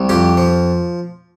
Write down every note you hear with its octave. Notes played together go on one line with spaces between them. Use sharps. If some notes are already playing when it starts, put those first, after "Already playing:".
Already playing: C2
F2 G4
F3